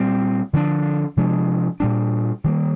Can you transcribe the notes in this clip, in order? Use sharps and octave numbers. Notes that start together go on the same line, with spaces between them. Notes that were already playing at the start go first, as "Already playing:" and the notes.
Already playing: A#2 G3 C4
D3 F3 G#3 D4
C3 F3 G#3 D4
A#2 G3 D4
D#3 G3 A#3